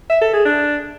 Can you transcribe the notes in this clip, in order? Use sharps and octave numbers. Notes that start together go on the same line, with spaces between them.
E5
A4
G#4
D4